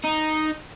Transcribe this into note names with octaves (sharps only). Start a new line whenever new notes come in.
D#4